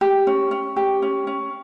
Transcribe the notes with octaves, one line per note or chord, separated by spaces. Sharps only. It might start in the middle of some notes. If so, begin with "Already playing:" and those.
G4
C#4
C#4
G4
C#4
C#4